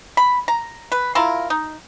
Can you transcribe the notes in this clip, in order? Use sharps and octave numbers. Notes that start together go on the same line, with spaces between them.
B5
A#5
B4
E4 F4 A#4
D#4